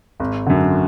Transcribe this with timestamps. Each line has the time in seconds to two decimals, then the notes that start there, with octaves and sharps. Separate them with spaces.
0.20 G#1
0.46 F#2 D3